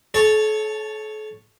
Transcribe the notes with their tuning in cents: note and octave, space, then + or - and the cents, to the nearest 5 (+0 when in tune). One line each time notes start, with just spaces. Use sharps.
A4 -40 C#5 +0 A5 +0